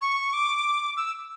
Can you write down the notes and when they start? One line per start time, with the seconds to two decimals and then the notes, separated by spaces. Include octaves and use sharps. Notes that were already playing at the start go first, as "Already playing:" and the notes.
0.02 C#6
0.33 D6
0.97 E6